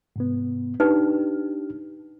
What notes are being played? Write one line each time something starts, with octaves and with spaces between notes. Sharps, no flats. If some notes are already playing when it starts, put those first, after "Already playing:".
G#2 C3 B3
D4 D#4 G4 B4